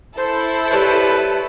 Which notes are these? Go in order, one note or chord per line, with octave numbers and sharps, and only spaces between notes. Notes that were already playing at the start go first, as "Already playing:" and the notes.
E4 A4 C5
G3 B4 C#5